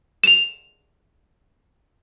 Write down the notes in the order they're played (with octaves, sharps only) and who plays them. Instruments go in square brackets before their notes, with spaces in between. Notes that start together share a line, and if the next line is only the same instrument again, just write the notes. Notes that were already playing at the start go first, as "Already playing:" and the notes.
[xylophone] E7 F7